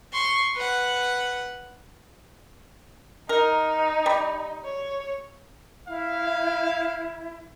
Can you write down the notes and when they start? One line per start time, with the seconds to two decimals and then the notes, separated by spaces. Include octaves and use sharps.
0.13 C6 C#6
0.56 B4 F#5
3.29 D#4 A#4
4.06 G3
4.64 C#5
5.88 E4 F5